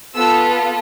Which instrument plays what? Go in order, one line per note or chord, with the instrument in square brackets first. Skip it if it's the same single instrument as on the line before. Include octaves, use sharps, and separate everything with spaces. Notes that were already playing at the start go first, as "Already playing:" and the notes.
[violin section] B3 F4 A4 E6